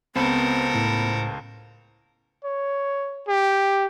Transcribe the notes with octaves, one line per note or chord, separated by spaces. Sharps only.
C#2 B3 C4 A4 A#4 C5 B5
A2
C#5
G4